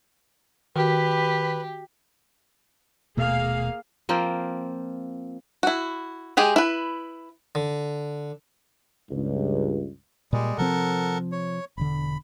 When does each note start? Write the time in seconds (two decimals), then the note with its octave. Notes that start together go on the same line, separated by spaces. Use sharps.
0.76 D#3 F#4 G4 B4
3.17 D#1 B2 A3 A#3 G#4 F5
4.09 F3 A#3 C4
5.63 E4 F#4
6.37 G#3 G4 G#4
6.56 E4 B4
7.55 D3
9.10 C#2 G2
10.33 A#2 G3 G#3
10.58 C3 F3 C4 A4 A#4 F#5
11.32 C#5
11.78 E1 D3 B5